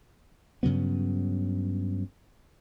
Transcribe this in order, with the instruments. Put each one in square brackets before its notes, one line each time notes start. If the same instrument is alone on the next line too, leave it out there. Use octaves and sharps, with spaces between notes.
[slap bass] G2 C#3 F#3 B3